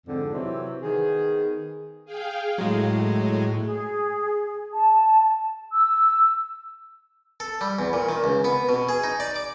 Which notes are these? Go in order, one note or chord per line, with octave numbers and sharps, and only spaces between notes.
F2 G#2 D3 C4
C3 E3 F#3 C4
D#3 B3 G#4
G#4 F5 G5
A2 F#3 G#3
G#4
A5
E6
A4
G3
E2
A#2
D#3
C#2
B3
B2
G#4
D#4
D5
D6